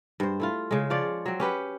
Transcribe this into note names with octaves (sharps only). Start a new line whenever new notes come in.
G2 C5
A3 E4 F4
C#3 G#3
F3 F4 C#5 D5
F#3 C4
C#4 G4 B4 F#5